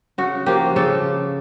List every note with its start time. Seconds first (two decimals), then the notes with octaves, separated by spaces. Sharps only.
0.18 C#3 F#4
0.46 F3 A#3 G4
0.76 C#3 A4